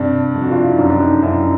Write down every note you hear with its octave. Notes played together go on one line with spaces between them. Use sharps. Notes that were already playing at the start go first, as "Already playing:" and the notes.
Already playing: G2 C3 D4
F2
F#4
F4
E4
D#4
F#2 D4
D4
D#4
F#2 E4